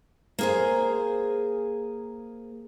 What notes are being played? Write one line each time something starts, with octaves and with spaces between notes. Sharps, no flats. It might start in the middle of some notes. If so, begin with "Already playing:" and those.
A#3 G#4 C5